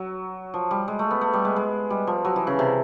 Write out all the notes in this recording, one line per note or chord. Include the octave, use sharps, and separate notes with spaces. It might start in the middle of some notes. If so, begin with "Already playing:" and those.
Already playing: F#3
F3
G3
G#3
A3
B3
A3
G3
G#3
G#3
G3
F3
F#3
E3
C#3
C3